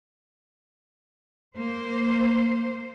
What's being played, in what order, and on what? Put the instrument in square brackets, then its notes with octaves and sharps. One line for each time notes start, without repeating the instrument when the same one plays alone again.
[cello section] A#3 C5